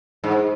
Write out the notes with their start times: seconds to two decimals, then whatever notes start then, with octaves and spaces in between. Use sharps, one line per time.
0.24 G#2